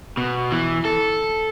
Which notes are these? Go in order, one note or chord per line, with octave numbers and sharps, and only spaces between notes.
B2
E3
A4